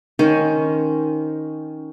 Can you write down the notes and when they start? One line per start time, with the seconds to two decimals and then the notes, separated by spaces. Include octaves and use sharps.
0.19 D#3 C#4 C5